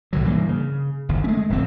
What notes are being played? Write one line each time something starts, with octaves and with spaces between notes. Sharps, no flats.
B1 D3 F#3
G2 E3 G#3 A#3
C#3
F#1 D#2
G#3 A3 C#4
D1 A#1 F2 C4